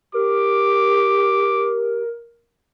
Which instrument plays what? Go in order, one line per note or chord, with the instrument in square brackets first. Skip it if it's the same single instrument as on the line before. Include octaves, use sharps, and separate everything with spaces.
[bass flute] G4 [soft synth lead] A#4 [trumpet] D6